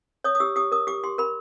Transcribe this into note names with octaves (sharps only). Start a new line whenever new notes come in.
C#5 D#6
D#6
G4 E6
G4 D#6
A#4 D#6
G4 D6
G4 C6
A#4 B5